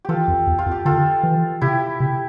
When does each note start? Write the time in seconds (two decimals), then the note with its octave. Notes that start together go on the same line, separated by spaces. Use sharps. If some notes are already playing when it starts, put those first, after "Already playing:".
0.05 E3 F4 G4 A4
0.28 F2
0.47 E2
0.58 F4
0.66 F2
0.71 G4
0.85 D3 F4 A4
1.23 E3
1.61 C3 E4 G4
2.00 C3